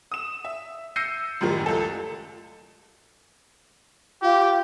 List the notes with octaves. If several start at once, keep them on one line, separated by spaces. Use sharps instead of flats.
D#6 E7
E5
E6 G6 A#6 C7 C#7 D#7
F#2 A2 D#3 F3 G3
C#2 A4
F4 G4